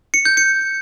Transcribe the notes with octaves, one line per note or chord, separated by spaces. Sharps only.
C#7
G6
C#7